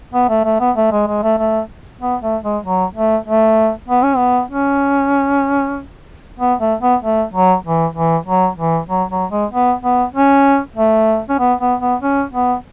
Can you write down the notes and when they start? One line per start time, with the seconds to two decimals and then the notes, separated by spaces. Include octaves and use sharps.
0.14 B3
0.29 A3
0.45 A3
0.60 B3
0.76 A3
0.91 G#3
1.07 G#3
1.23 A3
1.38 A3
2.01 B3
2.22 A3
2.43 G#3
2.63 F#3
2.95 A3
3.26 A3
3.89 B3
4.03 C#4
4.16 B3
4.51 C#4
6.39 B3
6.60 A3
6.81 B3
7.01 A3
7.33 F#3
7.64 E3
7.95 E3
8.26 F#3
8.57 E3
8.89 F#3
9.10 F#3
9.31 G#3
9.51 B3
9.82 B3
10.15 C#4
10.76 A3
11.29 C#4
11.39 B3
11.60 B3
11.80 B3
12.02 C#4
12.33 B3